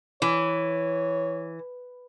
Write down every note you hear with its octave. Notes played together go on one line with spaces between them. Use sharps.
E3 C#5